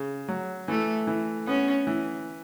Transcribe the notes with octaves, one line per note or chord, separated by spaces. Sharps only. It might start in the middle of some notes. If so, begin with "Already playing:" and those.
Already playing: C#3
F#3
E3 A3
E3
B3 C#4
E3